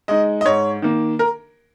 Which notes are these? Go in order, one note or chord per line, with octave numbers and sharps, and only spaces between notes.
G#3 D#4 D#5
D#5
G#2 C#5
D#3 A#3
A#4